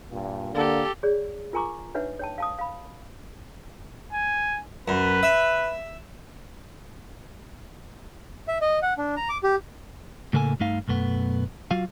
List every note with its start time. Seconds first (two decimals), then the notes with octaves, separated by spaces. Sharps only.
0.12 G2 A#2
0.55 D3 A#3 G4 A4
1.03 G#4 C#5 D5
1.53 F4 A#4 G#5 A#5 C#6 D6
1.95 D4 D#4 B4 C#5 E5 F#5
2.19 C#5 G5 A5
2.38 F5 A5 D#6
2.59 F5 B5
4.13 G#5
4.88 F#2 B4
5.23 E5
8.48 E5
8.62 D#5
8.82 F#5
8.98 D4
9.17 A#5
9.29 D6
9.44 G4
10.33 A2 C#3 A#3 A4 G#5
10.60 G2 A3 D#4 F5
10.88 B1 F#2 A3 B3
11.71 F#3 F4 F#4 F5